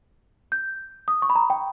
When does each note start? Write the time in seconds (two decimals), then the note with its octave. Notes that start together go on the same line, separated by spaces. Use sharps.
0.52 G6
1.08 D#6
1.22 C#6
1.30 B5
1.36 A#5
1.50 G5